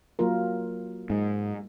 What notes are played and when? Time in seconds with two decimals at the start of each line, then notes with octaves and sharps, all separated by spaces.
0.19 F#3 A#3 F4 A#4
1.10 G#2